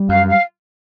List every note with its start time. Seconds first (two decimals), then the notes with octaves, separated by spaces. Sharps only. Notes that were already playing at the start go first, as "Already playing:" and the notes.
Already playing: G3
0.09 F#2 F5
0.28 F5